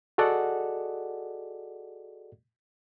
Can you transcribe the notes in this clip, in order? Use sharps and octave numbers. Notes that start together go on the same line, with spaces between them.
F#4 G#4 A4 D5 D#5 F#5